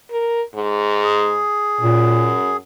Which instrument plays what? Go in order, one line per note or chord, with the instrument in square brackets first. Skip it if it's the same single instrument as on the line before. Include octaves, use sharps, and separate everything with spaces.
[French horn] A#4
G#2
[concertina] G#4
[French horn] F#2 [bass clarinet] A#2